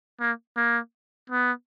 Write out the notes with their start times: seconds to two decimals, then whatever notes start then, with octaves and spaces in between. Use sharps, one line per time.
0.20 A#3
0.56 A#3
1.30 B3